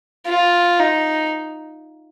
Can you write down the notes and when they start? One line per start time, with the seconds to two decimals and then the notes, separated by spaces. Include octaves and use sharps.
0.26 F4
0.80 D#4